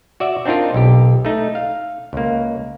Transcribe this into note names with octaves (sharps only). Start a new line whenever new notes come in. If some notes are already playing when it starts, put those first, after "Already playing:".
F#4 D5 E5
C4 D4 D#4 F4 A#4
B1 G4
A3 D#4
F5
C#2 A#3